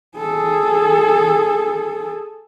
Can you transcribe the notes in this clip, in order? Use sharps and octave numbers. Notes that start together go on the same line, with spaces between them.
G#4 A4